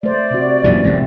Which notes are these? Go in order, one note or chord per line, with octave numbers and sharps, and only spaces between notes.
A3 C5 D5
C3 F#4
F#2 A#2 E3
C2 G#2 F3 A3 C4